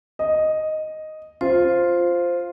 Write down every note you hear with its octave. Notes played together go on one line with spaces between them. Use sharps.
D#5
F4 C5